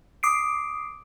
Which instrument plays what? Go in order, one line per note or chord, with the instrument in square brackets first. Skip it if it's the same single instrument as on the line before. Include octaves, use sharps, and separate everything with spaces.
[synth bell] D6 D#6 C7 D7